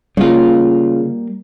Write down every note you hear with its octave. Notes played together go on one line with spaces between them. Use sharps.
C#3 G3 G#3 A#3 F4